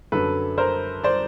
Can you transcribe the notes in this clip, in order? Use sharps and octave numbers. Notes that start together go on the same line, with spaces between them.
F#2 D3 F#3 A4 B4
A#4 C5
C5 D5